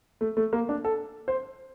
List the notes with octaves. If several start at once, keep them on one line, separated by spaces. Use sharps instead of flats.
A3
A3
A#3
D4
A4
C5